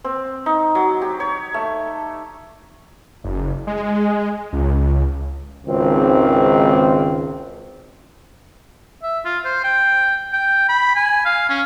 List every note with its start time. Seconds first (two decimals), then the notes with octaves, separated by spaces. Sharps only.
0.04 C4
0.46 D#4
0.75 F#3
1.02 G4
1.20 C#5
1.54 A3
3.24 F#1
3.67 G#3
4.53 C#2
5.67 G#1 C#2 D#3 C4
9.03 E5
9.25 F4
9.45 C5
9.64 G5
10.33 G5
10.69 B5
10.95 G#5
11.25 F5
11.50 C#4